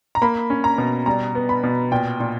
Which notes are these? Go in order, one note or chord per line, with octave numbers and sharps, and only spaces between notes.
A#5
A#3 B5
C#4
A#5
B2
G3 A#5
B3
B5
B2
A#2 G5
A#2